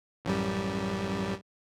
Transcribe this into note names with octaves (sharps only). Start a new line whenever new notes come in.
A1 F#2 G3